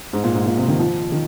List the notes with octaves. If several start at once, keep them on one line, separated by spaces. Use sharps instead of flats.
G#2
A#2
G#2
A#2
C3
D#3
F3
D#3